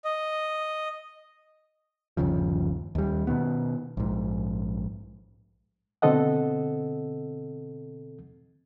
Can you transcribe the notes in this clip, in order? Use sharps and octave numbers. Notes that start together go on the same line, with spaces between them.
D#5
G1 D#2 C#3 F3
D#2 G3
B2 D#3 B3
A#1 G#2
B2 D3 C4 A4 D#5 F#5